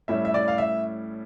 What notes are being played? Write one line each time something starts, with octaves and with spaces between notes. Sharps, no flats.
A2 G3 C#4 E4 E5
E5
D5
F5
E5